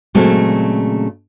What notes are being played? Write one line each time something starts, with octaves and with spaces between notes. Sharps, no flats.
A#2 C#3 F#3 G#3 A3 C4